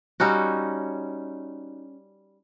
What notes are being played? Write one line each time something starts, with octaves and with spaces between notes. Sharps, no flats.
G3 C#4 D#4 F#4